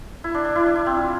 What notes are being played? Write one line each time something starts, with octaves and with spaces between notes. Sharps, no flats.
E4
D4
D4
E4
D4
E4
C4
F4